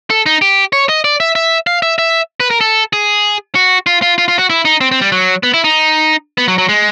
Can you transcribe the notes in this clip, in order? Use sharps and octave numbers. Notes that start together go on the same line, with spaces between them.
A4
D#4
G4
C#5
D#5
D5
E5
E5
F5
E5
E5
B4
A#4
A4
G#4
F#4
F4
F4
F4
F4
F#4
E4
D#4
C4
C4
G3
F#3
B3
E4
D#4
B3
F#3
F#3
G#3